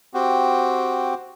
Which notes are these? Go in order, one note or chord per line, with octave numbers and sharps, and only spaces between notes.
C4 F#4 G4